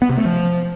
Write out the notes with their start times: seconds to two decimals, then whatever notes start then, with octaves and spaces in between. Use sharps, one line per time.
0.02 B3
0.10 C3
0.17 A3
0.25 F3